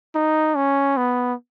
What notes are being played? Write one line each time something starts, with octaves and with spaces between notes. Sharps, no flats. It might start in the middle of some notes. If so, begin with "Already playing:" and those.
D#4
C#4
B3